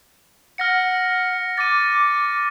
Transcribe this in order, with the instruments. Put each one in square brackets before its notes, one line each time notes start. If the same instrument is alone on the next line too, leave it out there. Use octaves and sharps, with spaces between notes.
[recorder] F#5 [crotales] F6 A#6 C#7
[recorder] D6 [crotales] A6 D#7